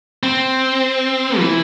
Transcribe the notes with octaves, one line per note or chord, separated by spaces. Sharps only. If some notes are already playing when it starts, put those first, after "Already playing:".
C4
E3